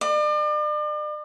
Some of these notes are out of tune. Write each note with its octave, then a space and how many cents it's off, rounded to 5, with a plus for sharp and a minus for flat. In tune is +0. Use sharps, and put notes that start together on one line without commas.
D5 +40